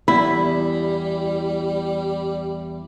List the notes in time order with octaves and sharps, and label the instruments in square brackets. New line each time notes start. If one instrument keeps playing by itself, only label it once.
[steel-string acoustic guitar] E2 [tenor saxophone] G3 [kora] E4 [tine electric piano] B5